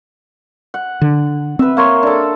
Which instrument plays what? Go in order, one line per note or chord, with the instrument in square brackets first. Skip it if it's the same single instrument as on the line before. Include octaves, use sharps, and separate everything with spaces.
[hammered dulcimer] F#5
[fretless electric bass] D3
[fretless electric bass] C4 [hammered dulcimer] B4 E5
[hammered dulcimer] A#3 C#5 C6
D4 A4